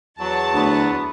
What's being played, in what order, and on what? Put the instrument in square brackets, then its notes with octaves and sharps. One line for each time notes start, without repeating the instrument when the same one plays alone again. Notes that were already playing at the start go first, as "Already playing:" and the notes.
[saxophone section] E2 F#3 [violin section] A5
[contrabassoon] D2 [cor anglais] B3